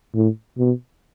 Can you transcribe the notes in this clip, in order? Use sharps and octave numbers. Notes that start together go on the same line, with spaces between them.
A2
B2